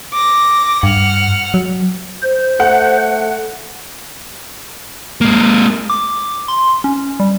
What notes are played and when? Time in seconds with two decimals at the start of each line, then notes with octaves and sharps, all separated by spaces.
0.13 D6 A#6
0.83 G2 F#5 F6
1.54 F#3
2.22 C5
2.60 A3 F#5
5.21 G#3 A#3
5.90 D6
6.48 C6
6.84 C#4
7.20 G3